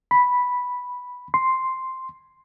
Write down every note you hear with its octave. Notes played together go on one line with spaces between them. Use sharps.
B5
C6